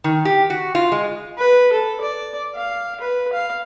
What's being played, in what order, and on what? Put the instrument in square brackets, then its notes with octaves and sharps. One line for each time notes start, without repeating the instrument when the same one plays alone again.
[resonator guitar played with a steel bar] D#3
G4
F#4
F4
G#3
[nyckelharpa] B4
A4
D5
F5
B4
F5